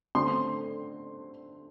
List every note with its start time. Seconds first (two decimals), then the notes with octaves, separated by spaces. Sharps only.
0.15 D3 A3 C4 C6